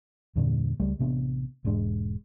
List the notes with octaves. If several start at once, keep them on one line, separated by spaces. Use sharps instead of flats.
E2 G2 A#2 D3
C#2 G3 A3
A1 C3 B3 D4
E1 G#2 G#3 D4